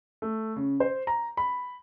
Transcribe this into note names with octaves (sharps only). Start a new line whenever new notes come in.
A3
C#3
C5
A#5
B5